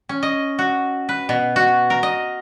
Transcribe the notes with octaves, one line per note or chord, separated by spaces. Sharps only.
C#4
D#5
F#4
B4
B2
F#4
A#4
D#5